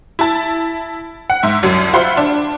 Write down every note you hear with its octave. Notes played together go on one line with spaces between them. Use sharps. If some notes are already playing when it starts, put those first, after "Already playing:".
E4 A5
F#5
G#2 E5
C2 F#2 F#3
F4 C5 E5 F#5 B5 C6
D4